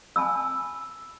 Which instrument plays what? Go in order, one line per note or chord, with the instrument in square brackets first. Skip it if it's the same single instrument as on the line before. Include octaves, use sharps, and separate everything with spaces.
[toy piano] G#5 A5 B5 E6